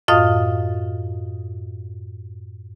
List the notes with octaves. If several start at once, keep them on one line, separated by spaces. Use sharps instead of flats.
F#2 A2 F4 D#5 F5 D#6